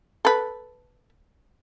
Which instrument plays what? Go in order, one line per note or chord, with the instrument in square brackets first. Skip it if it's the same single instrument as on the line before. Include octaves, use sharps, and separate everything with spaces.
[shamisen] A4 B4